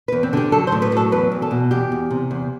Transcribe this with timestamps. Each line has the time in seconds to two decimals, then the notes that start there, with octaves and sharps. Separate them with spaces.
0.08 B4
0.12 E2
0.23 C4
0.33 D3 G4
0.52 F#3 A4
0.67 C5
0.72 A2
0.82 B4
0.92 F#3 A4
1.12 E2 B4
1.32 E2
1.42 A4
1.51 B2
1.71 E2 G4
1.92 E2
2.11 C3
2.31 E2